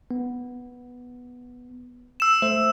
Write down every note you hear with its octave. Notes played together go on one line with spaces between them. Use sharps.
B3
E6 E7
A3 C5 E5